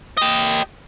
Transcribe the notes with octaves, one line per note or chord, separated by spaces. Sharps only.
G4 D#5